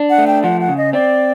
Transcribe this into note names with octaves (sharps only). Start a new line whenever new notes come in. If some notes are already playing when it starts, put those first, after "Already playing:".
Already playing: D4
F#5
A3
G5
F3 F#5
F#5
C#3
D#5
C4 D5